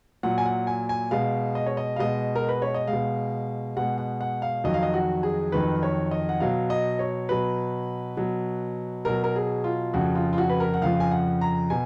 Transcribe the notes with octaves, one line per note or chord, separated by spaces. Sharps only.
A#2 F#3 F#5
G#5
F#5
G#5
G#5
B2 G#3 F5
D#5
C#5
D#5
F5
B2 G#3 D#5
A#4
B4
C#5
D#5
G#3 F5
B2
B2 G#3 F#5
F#5
F#5
F5
F2 D#3 F#3 D#5
F5
D#5
F#4
G#4
F2 D#3 F#3 B4
C#5
D#5
F#5
B2 F#3 F5
D#5
C#5
B2 F#3 B4
B2 F#3
B2 F#3 A#4
A#4
G#4
F4
F2 C#3 F3 F#4
F4
F4
F#4
B4
A#4
F#5
F2 C#3 F3 F5
G#5
F#5
A#5
B2 G#5